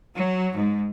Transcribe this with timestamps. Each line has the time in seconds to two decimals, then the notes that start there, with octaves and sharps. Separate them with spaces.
0.14 F#3
0.54 G#2